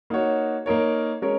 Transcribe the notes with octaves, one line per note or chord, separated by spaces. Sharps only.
A#3 D#4 F#4 C#5
A#3 D#4 A#4 C#5
G#3 C#4 A#4 C#5